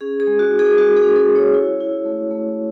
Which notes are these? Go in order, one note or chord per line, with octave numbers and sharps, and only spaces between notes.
C#4 G#4
G#4
G#3
F#4
E4
G#4
G#3 F#4
G#4
C#4
A4
G#3
C#5
E4
E4
A3
A3